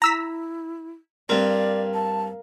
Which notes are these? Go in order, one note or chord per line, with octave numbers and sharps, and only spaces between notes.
E4 A#5 E6 B6
G2 C4 A#4 D5 F5
A5